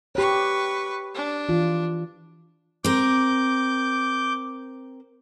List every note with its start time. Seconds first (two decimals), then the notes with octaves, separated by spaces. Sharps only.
0.15 G4 B4 C#5 C#6
1.15 D4
1.49 E3 F4
2.84 C4 A#4 D6 G6